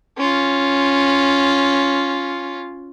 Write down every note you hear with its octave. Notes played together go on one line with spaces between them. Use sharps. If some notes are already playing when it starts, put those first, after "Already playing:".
C#4 F4